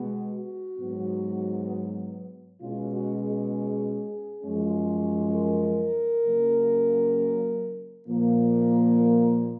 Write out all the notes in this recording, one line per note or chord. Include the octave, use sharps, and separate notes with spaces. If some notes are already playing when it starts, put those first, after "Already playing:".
Already playing: B2 G#3 B3
F#4
G#2 F#3 B3
B2 G#3 C#4 F4
F#4
G#4
F#2 F3 G#3 C#4
A#4
C#3 F#3 A#3 C#4
A#2 F3 A#3
A#4